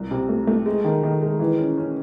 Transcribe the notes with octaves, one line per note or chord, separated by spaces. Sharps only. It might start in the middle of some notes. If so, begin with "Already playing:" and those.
Already playing: C2
C3
A3
A3
G#3
D#3
D#3
G#3
E3
C#4
C#4